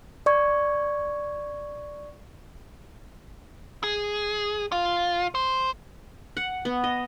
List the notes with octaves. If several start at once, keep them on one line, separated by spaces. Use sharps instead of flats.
D5 C#6 G#6
G#4
F4
C5
F#5
B3
D#5